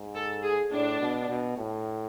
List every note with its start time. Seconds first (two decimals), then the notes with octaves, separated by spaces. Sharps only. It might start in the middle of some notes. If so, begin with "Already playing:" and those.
Already playing: G#2
0.15 A4
0.43 G#4
0.72 A2 D4
1.00 B2
1.29 B2
1.58 A2